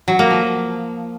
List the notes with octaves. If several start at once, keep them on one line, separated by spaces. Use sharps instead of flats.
F#3
A#3
F3